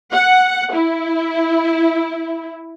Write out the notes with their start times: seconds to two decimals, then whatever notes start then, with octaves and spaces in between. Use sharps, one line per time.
0.12 F#5
0.73 E4